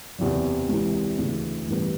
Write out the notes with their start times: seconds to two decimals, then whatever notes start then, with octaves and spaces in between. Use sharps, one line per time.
0.19 F#1 E2 C3
0.69 C#2 C3 E3
1.18 D2 C#3 E3
1.68 A1 G2 E3 G3 B3